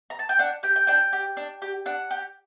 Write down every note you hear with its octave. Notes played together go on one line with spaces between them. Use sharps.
A#5
A5
G5
D4 F#5
G4 G5
G5
D4 G5
G4
D4
G4
D4 F#5
G4